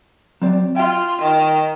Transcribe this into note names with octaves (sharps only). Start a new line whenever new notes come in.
F#3 C4 D5
F4 G5
D#3